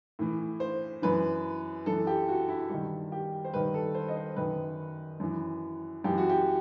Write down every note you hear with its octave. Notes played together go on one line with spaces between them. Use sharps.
A2 E3
C5
F#2 E3 B4
F#2 E3 A4
G4
F#4
E4
G2 D#3
G4
C5
G2 D#3 B4
A4
C5
D#5
C5
F#2 D#3 B4
F#2 E3
F#2 E3 G4
F#4
G4